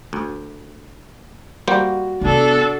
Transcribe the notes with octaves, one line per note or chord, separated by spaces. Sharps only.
D2
G3 A#3 F#4 C5
C3 B3 D4 A4